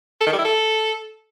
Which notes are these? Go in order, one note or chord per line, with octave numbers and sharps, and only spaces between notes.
A4
D#3
G3
E4
A4